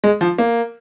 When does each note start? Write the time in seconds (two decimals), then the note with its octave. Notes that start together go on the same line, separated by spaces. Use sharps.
0.04 G#3
0.21 F3
0.38 A#3